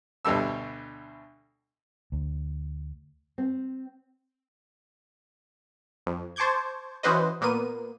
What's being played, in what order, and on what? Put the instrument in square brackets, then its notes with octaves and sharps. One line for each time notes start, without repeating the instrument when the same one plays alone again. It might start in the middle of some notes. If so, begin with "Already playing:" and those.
[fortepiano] D2 B2 D3 G3 E6
[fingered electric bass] D2
[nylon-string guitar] C4
[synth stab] F2
C5 A5 C#6 D6 G6 G#6
E3 C#4 F#4 B4 C5 D#5
A#2 A#3 B3 D#7